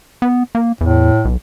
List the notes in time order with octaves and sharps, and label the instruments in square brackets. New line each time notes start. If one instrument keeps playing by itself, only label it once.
[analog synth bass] B3
A#3
[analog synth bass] E2 [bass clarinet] A2
[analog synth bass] B1